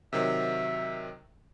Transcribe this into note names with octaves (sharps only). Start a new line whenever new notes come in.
C3 D#3 F#3 E5